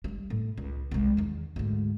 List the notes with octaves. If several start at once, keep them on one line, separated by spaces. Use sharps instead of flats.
F#3 G3
A2
C#2
C2 G#3
E2 D#3
D2 G#2